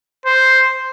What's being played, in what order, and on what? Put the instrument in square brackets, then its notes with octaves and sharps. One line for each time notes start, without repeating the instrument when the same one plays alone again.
[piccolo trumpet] C5